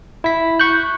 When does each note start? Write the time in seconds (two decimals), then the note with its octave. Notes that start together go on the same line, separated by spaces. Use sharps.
0.24 E4 B6
0.59 C#6 F#6 G6